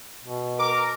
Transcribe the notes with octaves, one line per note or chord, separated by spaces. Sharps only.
B2
A#4 D6